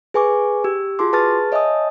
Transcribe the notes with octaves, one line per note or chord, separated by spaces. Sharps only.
G#4 B4 G#5 C#6 D6
G4 E6
F4 F#4 G#4 A5 C6 D6
G#4 B4 A5 C#6 F6 A6
C#5 D#5 E5 G#5 A5 D#6